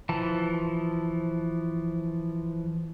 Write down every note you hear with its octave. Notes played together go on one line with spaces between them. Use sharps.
E3 F3 A5